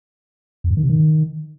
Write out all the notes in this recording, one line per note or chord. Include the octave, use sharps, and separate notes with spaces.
F2
G2
D#3
C3
D#3